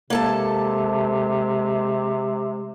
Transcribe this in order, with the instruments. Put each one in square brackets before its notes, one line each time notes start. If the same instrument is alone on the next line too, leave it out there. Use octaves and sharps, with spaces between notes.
[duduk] C3 [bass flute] G#3 [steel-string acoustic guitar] A#3 A4 A5